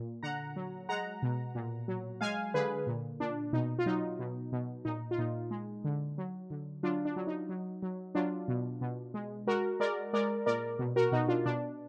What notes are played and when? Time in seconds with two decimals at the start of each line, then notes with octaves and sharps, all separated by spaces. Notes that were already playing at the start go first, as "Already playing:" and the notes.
Already playing: A#2
0.23 D3 F#5 A#5
0.56 F#3
0.89 G#3 F#5 A#5
1.22 B2
1.55 A#2
1.88 F#3
2.21 G#3 F5 G#5
2.54 D3 G#4 B4
2.87 A#2
3.20 A#2 D4
3.53 B2 D#4
3.79 F4
3.86 F#3 D#4
4.19 B2
4.52 B2
4.85 A#2 D#4
5.11 F4
5.18 A#2 D#4
5.51 G#3
5.84 D3
6.18 F#3
6.50 D3
6.83 F#3 D4 F4
7.05 D4
7.16 F#3
7.27 D#4
7.49 F#3
7.83 F#3
8.15 F#3 D4 F4
8.48 B2
8.81 B2
9.14 G#3
9.47 G#3 F#4 A#4
9.80 G#3 A#4 D5
10.13 G#3 A#4 D5
10.46 A#2 A#4 D5
10.79 B2
10.96 F#4 A#4
11.12 B2 D#4 F#4
11.28 D4 F4
11.45 B2 D4